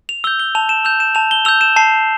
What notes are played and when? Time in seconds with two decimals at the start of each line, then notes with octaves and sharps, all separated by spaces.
0.09 F7
0.24 E6 G6 G7
0.39 G7
0.55 A5 F7
0.69 E7
0.84 E6 G6 F7
1.00 E7
1.15 A5 F7
1.31 G7
1.45 E6 G6 F7
1.61 E7
1.76 A5 C7